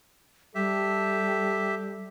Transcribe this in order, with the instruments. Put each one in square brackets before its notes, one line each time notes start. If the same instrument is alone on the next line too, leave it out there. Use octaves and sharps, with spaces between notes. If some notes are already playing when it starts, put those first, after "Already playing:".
[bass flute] G3 [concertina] G4 E5 [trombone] A4